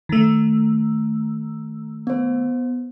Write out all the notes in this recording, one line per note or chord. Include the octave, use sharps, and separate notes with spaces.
D#3 A3
B3 C5